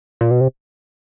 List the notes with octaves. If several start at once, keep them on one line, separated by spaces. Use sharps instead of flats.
A#2
B2
C3